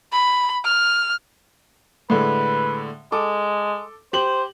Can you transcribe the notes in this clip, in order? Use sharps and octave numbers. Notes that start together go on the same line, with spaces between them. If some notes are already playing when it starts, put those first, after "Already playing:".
B5
F6
A2 D3 G#3 B4
G#3 A4 D6
G4 C5 F#7